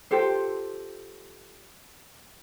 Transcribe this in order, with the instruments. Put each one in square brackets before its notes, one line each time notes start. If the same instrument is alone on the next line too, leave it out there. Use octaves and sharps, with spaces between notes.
[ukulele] F4 G4 A4 C5